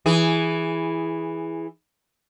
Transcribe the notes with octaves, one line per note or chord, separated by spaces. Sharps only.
E3 G#4